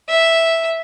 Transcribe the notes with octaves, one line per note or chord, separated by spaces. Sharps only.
E5